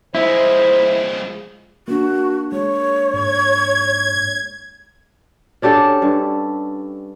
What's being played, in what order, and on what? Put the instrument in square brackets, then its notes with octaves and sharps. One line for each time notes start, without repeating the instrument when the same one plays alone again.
[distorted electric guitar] F3 G#3 [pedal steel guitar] E4 [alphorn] C5
[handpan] A#3 D4 [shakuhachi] F#4
[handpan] G#3 [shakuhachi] C#5
[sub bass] G#2 [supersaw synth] G#6
[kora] C#4 D4 G4 A4
G2